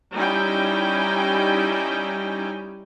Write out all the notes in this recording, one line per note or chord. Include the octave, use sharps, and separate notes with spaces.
G3 C#4 D#4 E4 G5 G#5